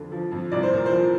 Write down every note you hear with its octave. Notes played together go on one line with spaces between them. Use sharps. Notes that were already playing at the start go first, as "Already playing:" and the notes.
Already playing: F2 D3
F3
F2
C2 D5
C5
A#2 A#4
C5
F3